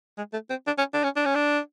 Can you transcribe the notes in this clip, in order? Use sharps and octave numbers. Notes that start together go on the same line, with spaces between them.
G#3
A3
C4
D4
C#4
D4
C#4
D4
C#4
D4